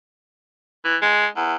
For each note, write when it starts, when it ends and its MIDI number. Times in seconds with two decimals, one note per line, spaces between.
0.85 0.96 52
1.02 1.27 56
1.36 1.56 40